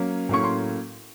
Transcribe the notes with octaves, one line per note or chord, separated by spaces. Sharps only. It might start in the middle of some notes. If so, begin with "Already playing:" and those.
Already playing: F#3 A#3 C#4
A2 F#3 A#3 C#4 C#6
C6